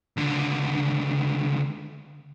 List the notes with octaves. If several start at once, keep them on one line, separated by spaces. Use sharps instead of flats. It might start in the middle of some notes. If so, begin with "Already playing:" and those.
C#2 D3